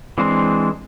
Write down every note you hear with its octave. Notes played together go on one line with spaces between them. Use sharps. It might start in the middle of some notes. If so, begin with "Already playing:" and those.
E3 G#3 C4 D4 C5